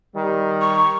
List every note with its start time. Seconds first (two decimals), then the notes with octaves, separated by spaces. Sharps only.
0.15 D#3 G3
0.61 C#6